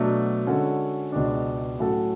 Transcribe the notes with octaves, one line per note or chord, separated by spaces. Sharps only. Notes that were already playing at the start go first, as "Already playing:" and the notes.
Already playing: B2 F#3 A3 D4
D3 G#3 C#4 F#4 A4
C#2 B2 G#3 D4
A2 F#3 C#4 F#4 A4